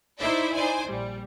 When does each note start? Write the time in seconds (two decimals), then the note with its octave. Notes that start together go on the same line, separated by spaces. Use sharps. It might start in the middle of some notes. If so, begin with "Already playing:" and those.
0.19 D#4 E4 C5 D5 E5
0.54 D#4 C5 D5 G#5
0.89 A#1 G3